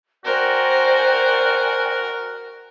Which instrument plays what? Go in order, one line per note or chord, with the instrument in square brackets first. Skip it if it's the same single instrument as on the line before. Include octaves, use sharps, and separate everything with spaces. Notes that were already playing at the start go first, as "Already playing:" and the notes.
[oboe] F#4 [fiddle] A#4 [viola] C5 [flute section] D5 G5 G#5